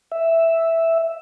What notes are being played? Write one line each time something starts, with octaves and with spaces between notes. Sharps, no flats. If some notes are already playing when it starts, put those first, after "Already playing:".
E5